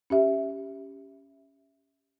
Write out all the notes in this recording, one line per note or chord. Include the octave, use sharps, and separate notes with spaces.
C#4 G4 E5